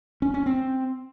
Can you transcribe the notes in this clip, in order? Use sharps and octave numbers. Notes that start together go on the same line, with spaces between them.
C#4
C#4
C4